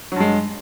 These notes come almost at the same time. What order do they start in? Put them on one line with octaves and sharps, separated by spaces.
F#3 G2 G#3